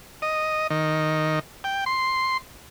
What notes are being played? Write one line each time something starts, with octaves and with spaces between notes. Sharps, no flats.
D#5
D#3
G5
C6